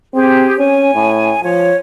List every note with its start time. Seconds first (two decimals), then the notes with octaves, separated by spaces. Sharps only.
0.15 C4 G4 G#4
0.59 C#4 G#5
0.95 A2
1.43 F3 C#5